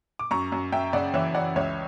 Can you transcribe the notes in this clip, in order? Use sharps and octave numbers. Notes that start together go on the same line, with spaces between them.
D6
F#2 A#5 C#6
F#2
F#2 E5 G5
C#3 D5 F#5
E3 C#5 E5
E3 D5 F#5
C#2 C#5 E5